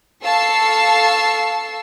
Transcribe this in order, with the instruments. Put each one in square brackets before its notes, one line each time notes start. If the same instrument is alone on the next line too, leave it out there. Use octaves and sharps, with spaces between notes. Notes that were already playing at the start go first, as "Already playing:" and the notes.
[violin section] A4 F5 A5 C#6 E6 C7